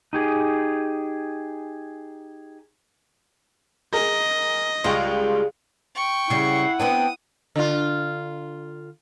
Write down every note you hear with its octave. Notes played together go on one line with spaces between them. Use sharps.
D#4 G4 G#4
G#4 A#4 D#5
C#2 G3 G#3 F4 G5 C#6
G5 C#6
C#3 G3 E4 F#5 C7
B3 C4 D4 G5 D#6
D3 F4